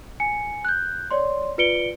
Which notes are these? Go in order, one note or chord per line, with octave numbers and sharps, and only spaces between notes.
G#5 C#7
F#6 G6
C#5 D5 C6
F4 B4 D5 C#7 D7 G7